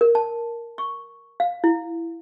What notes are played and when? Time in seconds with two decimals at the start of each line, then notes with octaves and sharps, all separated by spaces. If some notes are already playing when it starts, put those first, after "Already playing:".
0.01 A#4
0.15 A5
0.78 C#6
1.40 F5
1.64 E4